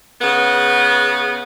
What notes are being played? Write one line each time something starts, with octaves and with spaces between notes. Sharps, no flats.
C#3 B3